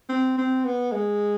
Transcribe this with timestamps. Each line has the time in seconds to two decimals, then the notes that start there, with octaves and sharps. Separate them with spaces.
0.09 C4
0.38 C4
0.64 B3
0.92 G#3